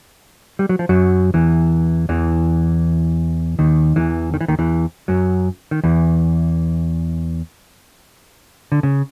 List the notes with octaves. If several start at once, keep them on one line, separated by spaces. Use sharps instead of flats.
G3
F#3
F3
F#2 F#3
E2 E3
E2 E3
D#2 D#3
E2 E3
D#3
E3
D#2 D#3
E2 E3
F#2 F#3
D#3
E2 E3
D3
C#3